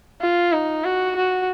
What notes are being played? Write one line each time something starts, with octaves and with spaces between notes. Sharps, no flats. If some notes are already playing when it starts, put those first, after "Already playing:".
F4
D#4
F#4
F#4